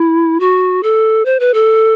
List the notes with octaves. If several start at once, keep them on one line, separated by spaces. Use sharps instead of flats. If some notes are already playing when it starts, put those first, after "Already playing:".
Already playing: E4
F#4
A4
C5
B4
A4